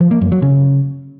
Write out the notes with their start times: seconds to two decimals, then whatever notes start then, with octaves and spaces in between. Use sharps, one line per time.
0.01 F3
0.11 A#3
0.21 F#2
0.32 F#3
0.42 C#3